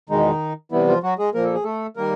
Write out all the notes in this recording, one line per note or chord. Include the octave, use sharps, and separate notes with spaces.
E2 B2 D#3 G#3 D#4
C3 E3 G3 B3 E4
F3 F4
F#3 F#4
G#3 G#4
A#2 F3 A#3 A#4
A4
G#4
A3 A4
D#3 G3 A#3 A#4